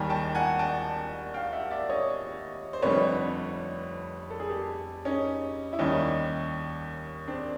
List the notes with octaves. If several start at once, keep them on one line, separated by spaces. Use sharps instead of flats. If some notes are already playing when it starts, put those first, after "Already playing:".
Already playing: D#2 D#3 G3 G#5 A#5
G5 A5
F#5 G#5
G5 A5
F5 G5
E5 F#5
D5 E5
C#5 D#5
C5
F1 F2 D3 G3 B4 C#5
A4
G#4
G4 A4
C#4 D#4
E4
D#2 D#3 G3 C#4 D#4
C4 D4